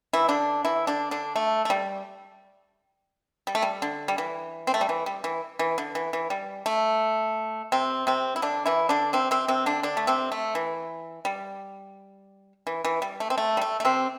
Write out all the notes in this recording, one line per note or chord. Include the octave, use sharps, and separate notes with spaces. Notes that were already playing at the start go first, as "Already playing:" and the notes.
E3 E4
D3 D4
E3 E4
D3 D4
D3 D4
A3
A3
G3
G3
A3
G3
D3
G3
E3
C4
A3
G3
E3
G3
E3
E3
D3
E3
E3
G3
A3
C3 C4
C3 C4
E4
D3 D4
E3 E4
D3 D4
C3 C4
C3 C4
C3 C4
D3 D4
D3 D4
A3
C3 C4
A3
E3
G3
E3
E3
G3
A3
C4
A3
G3
A3
A3
C3 C4